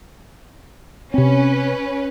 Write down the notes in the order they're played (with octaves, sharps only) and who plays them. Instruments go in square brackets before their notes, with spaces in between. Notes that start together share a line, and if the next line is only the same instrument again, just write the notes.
[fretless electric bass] C3 C4 [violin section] C#4 B4